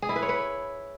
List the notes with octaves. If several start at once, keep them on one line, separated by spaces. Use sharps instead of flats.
G#4
E4
B4
C#5
B4